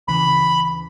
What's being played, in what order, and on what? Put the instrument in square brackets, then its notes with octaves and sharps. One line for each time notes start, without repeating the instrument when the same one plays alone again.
[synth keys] D2 C#3 E3 [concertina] B5